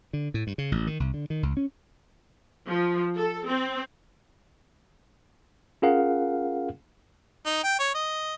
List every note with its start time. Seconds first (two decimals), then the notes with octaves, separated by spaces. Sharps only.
0.13 D3
0.34 A2
0.47 G2
0.58 C#3
0.72 A1
0.87 D#3
1.00 C2
1.14 D3
1.30 D#3
1.43 C#2
1.57 C#4
2.67 F3
3.17 A4
3.47 C4
5.82 C#4 F4 G#4 A#4 F5 F#5
7.46 D#4
7.64 G5
7.79 C#5
7.95 D#5